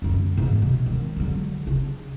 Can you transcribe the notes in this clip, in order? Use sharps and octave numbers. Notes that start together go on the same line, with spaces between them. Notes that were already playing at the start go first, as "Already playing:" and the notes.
F#2 D3
G#2 E3
B2
D#3
D3 F#3
C#3 D4